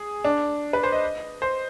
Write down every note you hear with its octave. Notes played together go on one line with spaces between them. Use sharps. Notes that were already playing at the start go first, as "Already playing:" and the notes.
Already playing: G#4
D4
B4
C5
D#5
C5